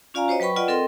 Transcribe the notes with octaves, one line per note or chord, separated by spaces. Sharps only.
C#4 F4 D5 F5 G#5 A#5
F#4 C5 C#5 D#5
F#3 B4 G5 B5 C#6
F4 B4 D5 D#5 F#5 G5
C4 A4 A#4 D#5 G5 C6